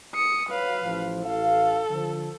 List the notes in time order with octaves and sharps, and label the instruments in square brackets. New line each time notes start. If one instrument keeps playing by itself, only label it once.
[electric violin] D#6 C#7
[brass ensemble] F#3 [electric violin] B4 F5
[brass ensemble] A1 F3
[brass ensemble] A1 F5 [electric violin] A4
[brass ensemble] D3 F3